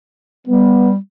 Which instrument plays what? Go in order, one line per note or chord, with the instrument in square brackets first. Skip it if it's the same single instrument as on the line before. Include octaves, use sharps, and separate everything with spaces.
[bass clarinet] G3 [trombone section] B3